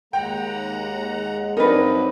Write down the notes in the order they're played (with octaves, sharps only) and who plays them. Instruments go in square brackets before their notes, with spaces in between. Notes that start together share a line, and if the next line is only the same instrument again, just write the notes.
[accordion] D#2 F#5 A#5 [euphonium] G#3 [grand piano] G5
[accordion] G2 F#3 [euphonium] C4 [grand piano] D4 D#4 [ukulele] A#4 B4